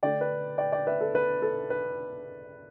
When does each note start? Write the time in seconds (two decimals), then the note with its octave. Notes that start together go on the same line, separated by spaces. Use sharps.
0.03 D3 A3 D4 D5 G5
0.21 B4
0.58 D5 G5
0.72 D5 G5
0.87 B4 E5
1.01 A4
1.15 B4
1.42 A4
1.70 B4